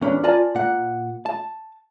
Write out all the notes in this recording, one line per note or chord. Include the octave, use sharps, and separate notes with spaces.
E2 C#4 D4 B5
F4 A#4 D5 G#5 A5
A#2 F#5
A5